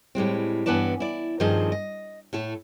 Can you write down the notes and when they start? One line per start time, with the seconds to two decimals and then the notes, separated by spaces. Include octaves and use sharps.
0.15 A2 G3 G#3 C4
0.66 G2 E3 B3 B4 D5 A5
1.00 E4 D5
1.40 G2 D#3 F3 C4 G#4 D#5
1.72 D#5
2.33 A2 A3 A4